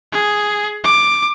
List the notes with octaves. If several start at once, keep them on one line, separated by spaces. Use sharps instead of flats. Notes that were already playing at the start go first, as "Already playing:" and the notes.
G#4
D6